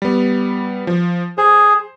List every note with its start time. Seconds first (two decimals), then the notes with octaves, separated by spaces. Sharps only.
0.02 G3 B3
0.87 F3
1.38 G#4 C5